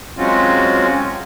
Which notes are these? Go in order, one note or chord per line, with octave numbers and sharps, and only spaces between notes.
F#3 G#3 C4 C#4 F4 F#4